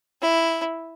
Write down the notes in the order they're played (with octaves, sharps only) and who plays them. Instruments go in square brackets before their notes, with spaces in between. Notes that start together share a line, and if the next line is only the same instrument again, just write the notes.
[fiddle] E4